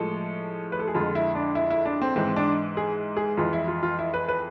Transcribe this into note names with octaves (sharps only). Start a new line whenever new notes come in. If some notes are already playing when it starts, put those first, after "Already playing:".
Already playing: A2 F3 G#3 A4
B4
A4
G#4
F2 D3 G#3 F4
E4
D4
E4
E4
D4
C4
G#2 E3 G#3 C4
D4
G#4
G#4
F2 E3 G#3 F4
E4
F4
F4
E4
B4
B4